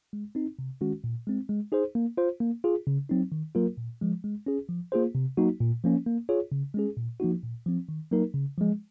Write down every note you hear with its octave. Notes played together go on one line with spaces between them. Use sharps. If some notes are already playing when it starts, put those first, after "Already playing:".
G#3
C4 D#4
C3
D#3 G#3 C#4 F#4
A#2
G#3 C4
G#3
D#4 G#4 C5
A#3
F4 C5
A#3
F4 G#4
C#3
F#3 C4 D#4
D#3
F#3 A#3 F4 A#4
A#2
F3 G#3
G#3
C#4 G#4
F3
A#3 F4 G#4 C5
C3
F#3 A#3 D#4 F#4
A#2
F3 A#3 C#4
A#3
F4 G#4 C#5
C#3
G#3 C#4 G#4
A#2
F3 A#3 D#4 F#4
A#2
F3 C4
D#3
F#3 A#3 D#4 A#4
C#3
F3 G#3